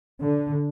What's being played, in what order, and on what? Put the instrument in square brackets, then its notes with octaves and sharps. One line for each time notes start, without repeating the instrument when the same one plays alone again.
[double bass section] D3